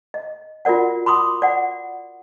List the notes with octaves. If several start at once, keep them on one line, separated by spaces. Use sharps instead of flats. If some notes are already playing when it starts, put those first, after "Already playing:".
D#5
F4 F#4 A#4 D5 F#5
B5 C6 D6 D#6
D5 F#5